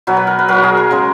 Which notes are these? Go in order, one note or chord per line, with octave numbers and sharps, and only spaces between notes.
B2 F#3 A#4
B4
A#4
B4
B2 F#3 A#4
F#4
G#4
A#4
C#3 G#3